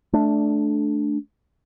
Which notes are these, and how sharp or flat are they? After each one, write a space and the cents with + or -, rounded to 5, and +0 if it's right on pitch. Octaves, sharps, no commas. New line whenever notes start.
A3 -20 D4 +0